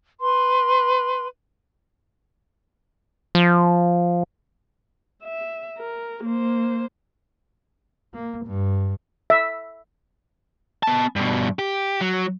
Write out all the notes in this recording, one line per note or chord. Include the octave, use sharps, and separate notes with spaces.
B4 C6
F3
E5
A#4
A#3 C5
A#3
G2
E5
B3 A5
G2 B2
G4
F#3